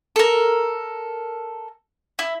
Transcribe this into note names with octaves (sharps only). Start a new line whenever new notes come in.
A4 A#4
E4